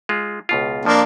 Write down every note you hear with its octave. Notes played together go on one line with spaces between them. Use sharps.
G#3 F4
C#2 B2 F4
F2 F3 A#3 D4